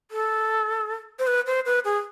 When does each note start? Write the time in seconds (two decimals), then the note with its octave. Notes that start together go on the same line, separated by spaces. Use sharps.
0.11 A4
1.19 C5
1.27 B4
1.47 C5
1.66 B4
1.85 G#4